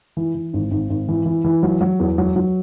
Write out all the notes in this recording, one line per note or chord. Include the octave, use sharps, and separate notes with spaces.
E3
E3
G#1
G#1
G#1
E3
E3
E3
F#3
F#3
E2
F#3
F#3